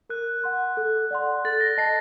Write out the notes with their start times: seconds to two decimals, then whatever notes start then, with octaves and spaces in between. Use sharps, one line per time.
0.10 A#4 F#6
0.44 F#5 C6
0.77 A4
1.11 D5 F#5 C6
1.45 A4 A6
1.60 A#6
1.78 D#5 A5 C7